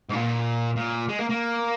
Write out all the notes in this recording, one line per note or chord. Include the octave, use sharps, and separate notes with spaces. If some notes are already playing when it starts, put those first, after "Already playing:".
G#2
A#2
A#2
G#3
A#3
A#3